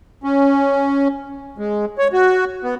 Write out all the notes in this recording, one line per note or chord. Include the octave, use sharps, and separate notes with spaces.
C#4
G#3
C#5
F#4
B3